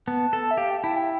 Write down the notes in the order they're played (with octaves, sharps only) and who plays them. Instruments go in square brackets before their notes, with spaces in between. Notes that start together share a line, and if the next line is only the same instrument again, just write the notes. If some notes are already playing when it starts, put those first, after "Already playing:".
[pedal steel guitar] B3 [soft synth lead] A5
[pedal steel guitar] A4
[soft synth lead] E5
[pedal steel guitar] G4 [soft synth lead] F5
[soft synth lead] G5
[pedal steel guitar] E4 [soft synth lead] A5
[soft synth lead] G5